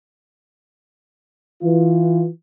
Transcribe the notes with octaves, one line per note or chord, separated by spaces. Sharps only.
E3 F4